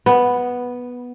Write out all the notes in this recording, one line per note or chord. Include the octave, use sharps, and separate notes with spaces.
B3